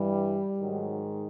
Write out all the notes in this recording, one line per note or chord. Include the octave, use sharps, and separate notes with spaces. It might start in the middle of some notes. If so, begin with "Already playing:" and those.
Already playing: G2 E3 G3
G#2 D#3 F#3